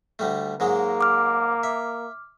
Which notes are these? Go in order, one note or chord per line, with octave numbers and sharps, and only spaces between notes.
D2 G3 A3
G#2 F#3 G#3 A#3
D6 F6
E5